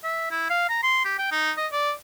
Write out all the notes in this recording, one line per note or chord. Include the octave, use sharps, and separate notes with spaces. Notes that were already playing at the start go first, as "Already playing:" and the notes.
E5
E4
F5
A#5
C6
G4
G5
D#4
D#5
D5